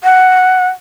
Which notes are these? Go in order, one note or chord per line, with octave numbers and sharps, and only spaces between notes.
F#5